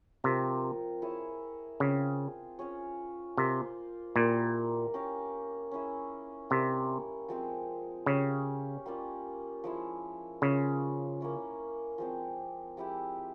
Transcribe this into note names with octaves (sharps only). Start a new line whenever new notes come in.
C3 F3 C4 F4 A#4
E4 G#4 C#5 E5
C#3 C4 F4 G#4
C#4 F4 G#4 C#5
C3 A#3 F4 C5 F5
A#2 G3 A#3 E4 A#4
C#4 G4 A#4 F5
C#4 E4 G#4
C3 G3 A#3 E4
F3 G#3 C4
C#3 C#4 G4 C#5 F5
G3 A#3 C#4 F4
F3 G#3 E4
C#3 G#3 C#4 F4
A#3 C#4 E4
F3 G#3 C4
F3 G#3 E4 G4